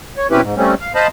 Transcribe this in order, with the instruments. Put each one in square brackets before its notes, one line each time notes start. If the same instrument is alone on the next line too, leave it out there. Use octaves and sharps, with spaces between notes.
[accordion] C#5
B2 C4 C#4 E4 G4 B4
G#2
G3 A3 C4 C#4
F5
C5 D#5 F5 A5 B5